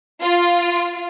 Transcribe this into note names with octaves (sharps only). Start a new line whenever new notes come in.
F4